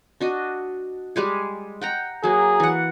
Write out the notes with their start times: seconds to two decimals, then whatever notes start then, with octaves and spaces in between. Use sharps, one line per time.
0.21 D4 F#4 D#5
1.16 G3 G#3 G#4
1.81 F#5 G5 A#5
2.24 F#3 A#3 G#4
2.60 E3 F#5